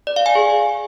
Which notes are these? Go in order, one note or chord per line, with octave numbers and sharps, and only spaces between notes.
D5
F5
G#5
G#4